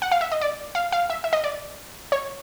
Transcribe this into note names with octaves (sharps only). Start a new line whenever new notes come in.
F#5
F5
E5
D#5
D5
F5
F5
E5
E5
D#5
D5
C#5